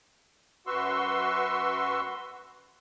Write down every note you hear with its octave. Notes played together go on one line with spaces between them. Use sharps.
F#2 F#4 B4 C6 C#6 E6